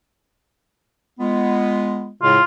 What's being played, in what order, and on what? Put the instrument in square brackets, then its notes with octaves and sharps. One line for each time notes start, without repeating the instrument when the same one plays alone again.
[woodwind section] G#3 B3 F4
[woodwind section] A2 C#3 G#3 [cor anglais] F4